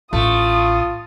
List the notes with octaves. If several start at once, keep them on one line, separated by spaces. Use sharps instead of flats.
A1 A3 F4 D#6